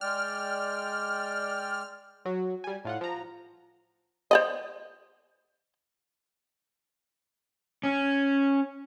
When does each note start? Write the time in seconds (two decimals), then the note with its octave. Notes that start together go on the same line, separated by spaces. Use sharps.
0.01 G#3 D5 G5 F6
2.25 F#3 F#4
2.64 G3 G#5
2.85 A2 F4 F#5
3.01 F3 A#5
4.31 C5 D5 D#5
7.83 C#4